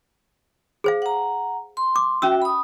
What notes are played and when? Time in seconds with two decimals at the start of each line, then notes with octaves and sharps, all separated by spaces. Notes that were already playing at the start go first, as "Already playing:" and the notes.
0.84 G#4 C5 F5
1.02 F#5 A#5
1.77 C6
1.96 D6
2.22 C#4 F#4 E5 G5 E6
2.42 B5 D#6